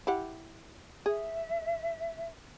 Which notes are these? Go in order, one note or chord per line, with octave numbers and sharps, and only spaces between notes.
E4 G4 F#5
G#4 E5